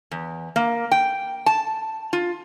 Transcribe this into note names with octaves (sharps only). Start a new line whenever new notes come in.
E2
A#3
G5
A5
F4